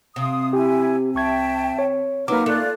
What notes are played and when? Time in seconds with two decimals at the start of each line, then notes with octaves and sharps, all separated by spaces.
0.16 C3 F5 D#6
0.53 E4 G4 G#5
1.15 C2 E5 G5 A5 C#6 G#6
1.79 C#5
2.28 F#3 A#3 D#4 B4 A#5 D6 F6
2.46 A3 F4 D5 F#6